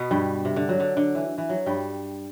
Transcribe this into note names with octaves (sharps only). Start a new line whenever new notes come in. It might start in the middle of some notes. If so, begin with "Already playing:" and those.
Already playing: B2 B3
G2 G3
C3
D3
F#3
D3
D3
E3
E3
F#3
G2 G3